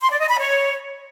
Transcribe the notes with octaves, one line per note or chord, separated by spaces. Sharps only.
C6
D5
D#5
B5
C#5